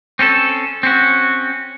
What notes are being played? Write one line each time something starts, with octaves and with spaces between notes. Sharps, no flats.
C4 C#4 F4 A4
C4 C#4 F#4